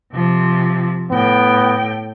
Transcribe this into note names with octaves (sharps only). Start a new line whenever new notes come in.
C3 F3
A2 B3 G5